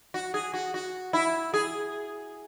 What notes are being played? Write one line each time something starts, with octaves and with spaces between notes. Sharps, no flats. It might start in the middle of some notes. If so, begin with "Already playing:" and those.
F#4
G#4
F#4
F#4
E4
G#4